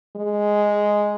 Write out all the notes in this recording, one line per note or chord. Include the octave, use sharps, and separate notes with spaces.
G#3